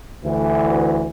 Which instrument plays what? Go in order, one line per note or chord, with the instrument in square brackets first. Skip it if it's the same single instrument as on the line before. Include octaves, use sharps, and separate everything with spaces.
[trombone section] D2 E3